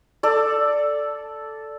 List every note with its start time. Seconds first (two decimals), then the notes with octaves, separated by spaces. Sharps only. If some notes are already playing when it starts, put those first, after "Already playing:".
0.23 A4 D5